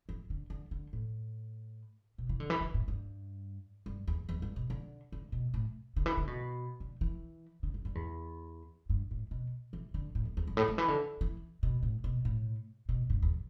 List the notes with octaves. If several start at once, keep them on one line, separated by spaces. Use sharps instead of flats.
E3
D3
D3
D3
A2
B2
E3
D3
E3
D3
A2
G2
G2
E2
E2
G2
B2
D3
D3
B2
A2
D3
E3
D3
B2
D3
E3
D3
G2
G2
E2
G2
A2
B2
E3
D3
A2
E2
E2
G2
A2
D3
E3
D3
E3
B2
A2
B2
A2
B2
G2
E2